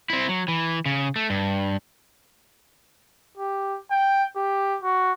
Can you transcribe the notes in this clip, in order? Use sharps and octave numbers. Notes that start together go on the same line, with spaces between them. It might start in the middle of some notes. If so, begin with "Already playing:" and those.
C4 E4
F#3
E3
C#3
A3
G2
G4
G5
G4
F#4